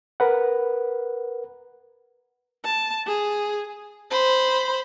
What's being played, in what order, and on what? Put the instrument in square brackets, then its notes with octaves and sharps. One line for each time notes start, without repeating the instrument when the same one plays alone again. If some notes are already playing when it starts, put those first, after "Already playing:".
[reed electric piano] A#4 B4 F#5
[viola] A5
G#4
[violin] C5 B5